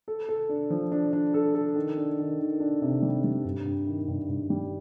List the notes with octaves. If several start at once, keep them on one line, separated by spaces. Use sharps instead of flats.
A4
A4
D4
F3
D4
D4
A4
A4
D#3
D4
D#3
D#3
D4
C3
G3
G3
G2
G2
D#3
G2
G2
G3